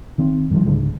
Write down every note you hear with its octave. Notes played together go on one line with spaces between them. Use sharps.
D#3 C4
G2 D#3 F3
C#2 G#2 D3 G#3